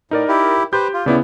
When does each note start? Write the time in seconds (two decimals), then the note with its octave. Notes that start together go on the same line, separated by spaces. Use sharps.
0.11 A2 D#4 A#4 D5
0.28 E4 G4
0.73 G4 B4 C5 G6
0.93 F4
1.06 D2 C#3 B3 E4 D5